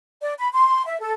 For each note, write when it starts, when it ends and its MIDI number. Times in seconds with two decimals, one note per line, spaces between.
0.22 0.33 74
0.39 0.50 83
0.53 0.86 84
0.86 1.00 76
1.00 1.12 69